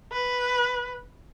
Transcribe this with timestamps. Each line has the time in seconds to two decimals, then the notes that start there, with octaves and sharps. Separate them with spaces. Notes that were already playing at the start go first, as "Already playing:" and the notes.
0.12 B4